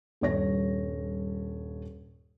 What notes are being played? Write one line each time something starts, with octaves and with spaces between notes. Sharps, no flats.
D#1 G2 C#5 A#6